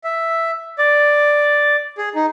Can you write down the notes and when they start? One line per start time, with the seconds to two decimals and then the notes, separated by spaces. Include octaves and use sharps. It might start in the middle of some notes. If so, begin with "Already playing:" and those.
0.04 E5
0.78 D5
1.98 G#4
2.15 D#4